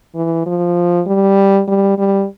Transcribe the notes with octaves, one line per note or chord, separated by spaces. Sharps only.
E3
F3
G3
G3
G3